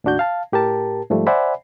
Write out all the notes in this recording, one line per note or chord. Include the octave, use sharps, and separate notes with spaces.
D#2 A2 D4 F#4 G6
F5 A5
A2 G4 A#4 A5
G#2 F3 G3 A3
C5 D5 E5 F#5 G#5 B5